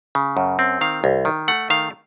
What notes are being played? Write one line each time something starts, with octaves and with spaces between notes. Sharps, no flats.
C#3
F#2
C4
D#3 F5
C2
D#3
A3 F#5
D#3 F5